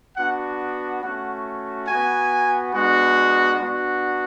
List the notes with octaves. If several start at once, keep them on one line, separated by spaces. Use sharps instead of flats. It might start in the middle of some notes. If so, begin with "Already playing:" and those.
B3 D4 F#4 F#5
A3 C#4 F#4 F#5
B3 F#4 G#5
G#3 B3 D4 F#4
B3 D4 F#4